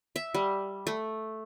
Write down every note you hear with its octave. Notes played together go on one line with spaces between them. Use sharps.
E5
G3
A3